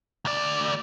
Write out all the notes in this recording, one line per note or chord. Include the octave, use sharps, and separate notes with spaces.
D2 D5